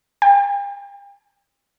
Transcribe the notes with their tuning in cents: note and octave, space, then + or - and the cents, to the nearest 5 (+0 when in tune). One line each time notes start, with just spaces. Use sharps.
G5 +45